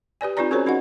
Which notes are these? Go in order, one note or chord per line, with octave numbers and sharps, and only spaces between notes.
G4 B4 D5 G#5
C4 D#4 F4 B4 D5 A#5
C#4 F#4 G#4 A#4 C5 C#5
C#4 D#4 F#4 D#5 F#5